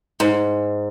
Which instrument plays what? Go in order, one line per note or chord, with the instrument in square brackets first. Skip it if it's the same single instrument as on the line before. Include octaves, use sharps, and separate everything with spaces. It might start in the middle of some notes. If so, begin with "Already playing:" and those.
[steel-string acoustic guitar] G#2